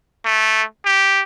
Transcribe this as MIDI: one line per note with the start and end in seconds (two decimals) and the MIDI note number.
0.25 0.63 57
0.85 1.22 67